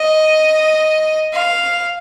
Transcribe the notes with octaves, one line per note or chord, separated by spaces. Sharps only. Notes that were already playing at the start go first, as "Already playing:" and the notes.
Already playing: D#5
F5